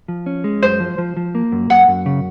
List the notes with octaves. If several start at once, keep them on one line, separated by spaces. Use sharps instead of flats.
F3
C#4
G#3
F#2 C5
F3
F3
F3
A#3
F#2
F#2 F#5
F#2
C#3